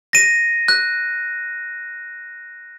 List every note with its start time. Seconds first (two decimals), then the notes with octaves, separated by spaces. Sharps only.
0.13 A#6 D#7
0.68 F#6